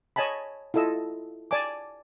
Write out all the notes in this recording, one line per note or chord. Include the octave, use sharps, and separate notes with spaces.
C#5 D#5 G#5 A5 B5
E4 F4 A4 D#5 E6
D5 G#5 A5 D6